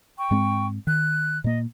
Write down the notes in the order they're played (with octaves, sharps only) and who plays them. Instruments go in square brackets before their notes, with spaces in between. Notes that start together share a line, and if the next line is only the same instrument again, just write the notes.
[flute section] G5 C#6
[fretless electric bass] G#2 G#3 C4
[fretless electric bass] D#3 [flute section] F#6
[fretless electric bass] A#2 A#3 [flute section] D#5